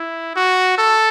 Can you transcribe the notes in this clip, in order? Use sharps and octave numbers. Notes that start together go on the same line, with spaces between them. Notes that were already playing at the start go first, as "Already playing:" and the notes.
Already playing: E4
F#4
A4